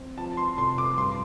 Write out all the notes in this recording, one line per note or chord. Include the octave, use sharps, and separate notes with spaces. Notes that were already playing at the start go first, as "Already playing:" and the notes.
Already playing: C4
F3 A5
C6
F1 C6
D6
G2 C6